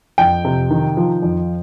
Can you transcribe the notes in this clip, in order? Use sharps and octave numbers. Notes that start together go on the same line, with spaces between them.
F2 G5
C3
D#3
F3
F2